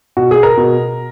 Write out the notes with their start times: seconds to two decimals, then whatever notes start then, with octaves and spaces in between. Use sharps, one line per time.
0.17 B2 F#4
0.31 G#4
0.43 A#4
0.57 B2